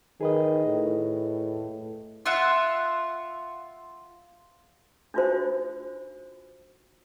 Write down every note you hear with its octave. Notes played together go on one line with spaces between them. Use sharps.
D#3 G#4 B4 D#5
A2
F4 E5 F#5
D4 D#4 F4 F#4 C5